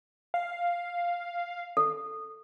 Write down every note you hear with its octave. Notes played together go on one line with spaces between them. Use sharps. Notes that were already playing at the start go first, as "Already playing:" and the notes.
F5
A4